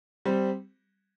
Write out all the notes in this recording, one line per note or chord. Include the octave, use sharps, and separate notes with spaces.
G3 C4